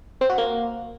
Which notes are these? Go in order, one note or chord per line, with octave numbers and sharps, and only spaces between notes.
C4
F#4
A#3